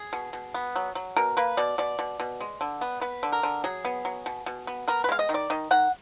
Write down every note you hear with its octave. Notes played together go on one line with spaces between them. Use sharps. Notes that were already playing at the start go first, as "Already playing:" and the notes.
Already playing: G#4
B2
B2
B3
F#3
F#3
B2 A#4
A#3 B4
B2 D5
B2 D5
B2
B2
G#3
D3
B3
B3 B4
D3
A#4
D3
F#3 G#4
B3
F#3
B2
B2
B3
B3 A#4
B4
G#3 F5
D#5
D#3
D5
D#3 D#5
D#3 F#5